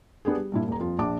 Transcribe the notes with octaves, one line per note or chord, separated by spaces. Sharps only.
B3 D4 G4 G#4
G3
G2 A#2 E4
D#1 A#5
F2 F4
A#1 D4 A5 D6